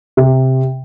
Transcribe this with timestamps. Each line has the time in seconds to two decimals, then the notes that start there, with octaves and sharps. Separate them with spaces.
0.17 C3